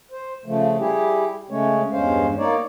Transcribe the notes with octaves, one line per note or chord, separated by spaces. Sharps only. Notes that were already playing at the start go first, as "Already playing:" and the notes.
C5
C#3 F3 A3
G3 E4 G4 G#4
C#3 G#3 A3 C#4 C#5
E2 G2 G#3 C#4 C5 F5
A#3 D#4 C#5 D5